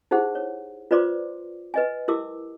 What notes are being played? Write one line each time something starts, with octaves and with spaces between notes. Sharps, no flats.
D#4 E4 G4 G#4 C5 F#5
C#5
F4 B4 C5 D5 C6 D6
B4 D#5 G#5
E4 G4 A#4 D6 E6